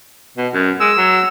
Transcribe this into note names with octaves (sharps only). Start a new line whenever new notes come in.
B2
F#2
G#3 E6
F#3